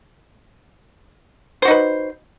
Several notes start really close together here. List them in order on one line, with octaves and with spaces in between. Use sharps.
C5 F#4 D#4 B4